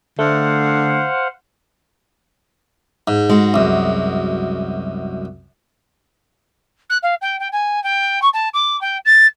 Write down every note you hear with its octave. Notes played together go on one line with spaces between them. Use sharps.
D3 A3 C5 F5 F#5
G#2
G#3 F#4
C2 F#2
F#6
F5
G5
G5
G#5
G5
C#6
A5
D6
G5
A6